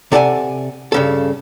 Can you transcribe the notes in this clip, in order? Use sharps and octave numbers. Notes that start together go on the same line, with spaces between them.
C3 A4 D5 F#5 G#5
G2 C#3 A4